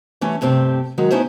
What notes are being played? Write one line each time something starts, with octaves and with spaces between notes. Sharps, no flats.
E3 G3 A3 C#4
G2 C3 A3 C4 G4
D#3 F#3 G#3
A3 B3 C#4 D#4 E4 C5